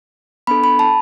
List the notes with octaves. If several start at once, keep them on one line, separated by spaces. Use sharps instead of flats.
B3 D4 A4 B5
B5
A5